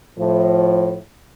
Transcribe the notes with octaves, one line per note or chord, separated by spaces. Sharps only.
A2 F3